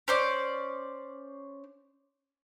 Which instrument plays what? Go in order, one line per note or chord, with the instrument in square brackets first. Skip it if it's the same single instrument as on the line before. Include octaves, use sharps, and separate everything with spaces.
[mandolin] C#4 C5 D5